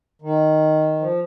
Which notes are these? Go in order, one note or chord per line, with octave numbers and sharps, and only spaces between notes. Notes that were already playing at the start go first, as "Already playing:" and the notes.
D#3
F3